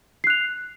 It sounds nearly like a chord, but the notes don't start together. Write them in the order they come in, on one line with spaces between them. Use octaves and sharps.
C7 F#6 F7